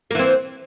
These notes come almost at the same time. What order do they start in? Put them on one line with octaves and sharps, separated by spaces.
A#3 E3 C4